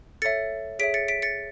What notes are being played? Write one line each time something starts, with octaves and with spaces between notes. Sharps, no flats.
A4 C#5 E5 A6 C#7
G#4 C#5 E5 B6 D7
A6 C#7
B6 D7
A6 C#7